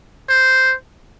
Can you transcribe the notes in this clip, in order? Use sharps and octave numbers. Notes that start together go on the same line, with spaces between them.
C5